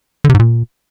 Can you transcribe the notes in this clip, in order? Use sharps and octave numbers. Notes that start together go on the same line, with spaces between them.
D3
C3
G#2
A#2